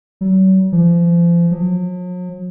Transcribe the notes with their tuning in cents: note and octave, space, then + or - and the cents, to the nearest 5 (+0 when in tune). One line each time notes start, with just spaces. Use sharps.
F#3 +40
F3 -35
F#3 -45